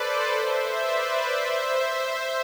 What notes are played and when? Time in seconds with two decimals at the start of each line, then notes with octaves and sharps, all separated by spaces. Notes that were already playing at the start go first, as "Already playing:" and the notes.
Already playing: A4 B4 C5 D5
0.31 C5 E5
0.83 B4 D5
1.33 C5 E5
1.83 C5 E5